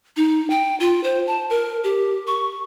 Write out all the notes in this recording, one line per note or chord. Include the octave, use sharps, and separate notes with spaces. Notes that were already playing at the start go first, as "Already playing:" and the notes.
D#4
G5
F4
C5
A5
A#4
G4
C#6